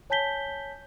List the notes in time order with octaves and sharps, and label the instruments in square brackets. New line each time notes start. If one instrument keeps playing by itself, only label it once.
[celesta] C#5 G#5 A5 G6 B6 G7